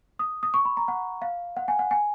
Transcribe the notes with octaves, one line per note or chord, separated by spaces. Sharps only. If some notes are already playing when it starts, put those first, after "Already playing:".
D#6
D#6
C#6
B5
A#5
F#5
F5
F#5
G#5
F#5
G#5